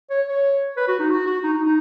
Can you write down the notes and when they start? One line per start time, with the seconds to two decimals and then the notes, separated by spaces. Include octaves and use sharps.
0.10 C#5
0.28 C#5
0.77 B4
0.88 F#4
0.99 D#4
1.10 F#4
1.26 F#4
1.43 D#4
1.54 D#4
1.65 D#4